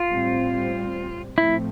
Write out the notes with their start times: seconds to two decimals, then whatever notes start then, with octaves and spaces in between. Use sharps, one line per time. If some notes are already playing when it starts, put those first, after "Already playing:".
Already playing: F4
0.08 A2 G3 C4
1.37 A2 F3 A3 C4 E4